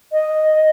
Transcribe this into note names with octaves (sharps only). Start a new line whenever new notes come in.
D#5